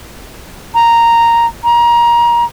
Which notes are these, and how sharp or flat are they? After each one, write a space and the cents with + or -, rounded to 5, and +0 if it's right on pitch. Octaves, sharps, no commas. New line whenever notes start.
A#5 -5
A#5 +25